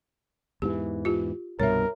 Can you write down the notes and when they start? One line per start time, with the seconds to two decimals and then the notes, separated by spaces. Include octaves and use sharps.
0.62 E2 G#2 E3 G4
1.05 F4 G4
1.60 C2 G2 B2 A#4 C#5 E5